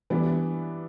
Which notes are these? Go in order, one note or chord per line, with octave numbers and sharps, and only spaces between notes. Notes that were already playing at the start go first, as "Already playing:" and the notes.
E3 G3 B3 D4